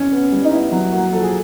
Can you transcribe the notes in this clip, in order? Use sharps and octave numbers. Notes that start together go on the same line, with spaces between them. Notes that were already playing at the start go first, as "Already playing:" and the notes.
Already playing: C#4
B3
G3
D#4
B3 E4
F#3
A#3 F#4
F3 A4
G#4